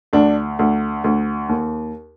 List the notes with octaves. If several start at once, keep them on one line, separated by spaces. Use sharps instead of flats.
D2 D4
D2
D2
D#2